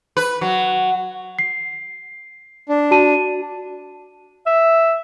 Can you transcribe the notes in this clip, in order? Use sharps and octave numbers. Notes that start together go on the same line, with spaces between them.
B4
F#3
C7
D4
F#4 A5 D#7
E5